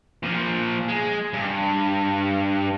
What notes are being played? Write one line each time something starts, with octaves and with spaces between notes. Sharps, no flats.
A#2 F3
G#3
G2